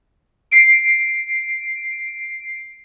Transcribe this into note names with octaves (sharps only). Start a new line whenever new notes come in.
C7 D7